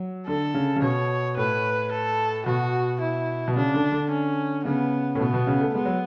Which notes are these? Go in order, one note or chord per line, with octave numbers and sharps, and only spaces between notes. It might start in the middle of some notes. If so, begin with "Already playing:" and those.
Already playing: F#3
D3 A4
C#3
C#3
B2 C#5
A2 B4
A4
B2 F#4
E4
B2
C#3 D4
D3
D3
C#4
C#3 B3
A2
B2 B3
B2
C#3
A3
G#3 B3
F#3